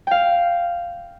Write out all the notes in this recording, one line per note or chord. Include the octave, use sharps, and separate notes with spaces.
F5 G5